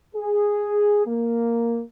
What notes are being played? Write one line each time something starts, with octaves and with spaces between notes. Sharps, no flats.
G#4
A#3